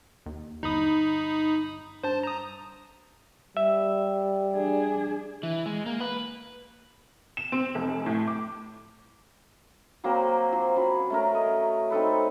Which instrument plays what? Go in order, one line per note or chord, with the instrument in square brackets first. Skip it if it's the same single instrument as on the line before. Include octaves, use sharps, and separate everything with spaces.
[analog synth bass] D#2
[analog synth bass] G1 [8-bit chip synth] D#4 B5 D#6
[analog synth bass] G2 [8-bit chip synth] C5 A5
[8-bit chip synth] A#5 D#6
[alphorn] G3 [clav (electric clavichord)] E5
[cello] D4 G#4
[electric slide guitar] E3
G#3
A#3
B4
[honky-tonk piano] E7
C4
F1
A2
D6
[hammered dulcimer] F#3 A#3 C4
F3
F#3 C#4 B5
A3 C#4 A#4
D#5
C4 D#4 A4 B4